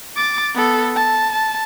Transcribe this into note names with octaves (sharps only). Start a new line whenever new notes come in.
D6 A6
B3 A4
A5
A5